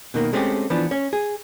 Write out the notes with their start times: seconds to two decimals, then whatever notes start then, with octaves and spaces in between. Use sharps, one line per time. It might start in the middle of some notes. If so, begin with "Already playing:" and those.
0.14 B2 D#3 A#3
0.33 G#3 A3 C4 C#4 G4
0.70 E3 F3 B3 D4
0.91 C#4 C#5
1.13 G#4